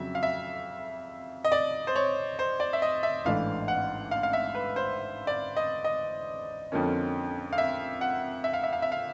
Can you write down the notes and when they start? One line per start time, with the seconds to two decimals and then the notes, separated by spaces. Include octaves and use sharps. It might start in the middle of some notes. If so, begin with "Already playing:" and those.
Already playing: F2 C#3 F#3 E5
0.15 F5
0.23 E5
1.45 D#5
1.52 D5
1.87 C5
1.96 C#5
2.39 C5
2.60 D5
2.73 E5
2.82 D#5
3.03 E5
3.25 A1 G#2 E3 A3 D4 F5
3.68 F#5
4.11 F5
4.23 F5
4.33 E5
4.55 B4
4.76 C5
5.27 D5
5.57 D#5
5.84 D#5
6.72 F2 D3 F3 A#3 C#4
7.53 F5
7.58 E5
8.01 F#5
8.44 E5
8.53 F5
8.63 E5
8.73 F5
8.82 E5
8.92 F5